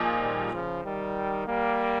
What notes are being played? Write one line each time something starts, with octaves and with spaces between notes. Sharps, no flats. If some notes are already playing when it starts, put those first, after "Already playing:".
Already playing: A#2 F3 A#3 D#4 G#4
D#3 G3
C#3 F3
D#3 G3
G3 A#3